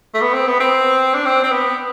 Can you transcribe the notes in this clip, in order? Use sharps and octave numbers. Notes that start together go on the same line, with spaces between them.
A3
B3
C4
B3
C4
D4
C4
C4
B3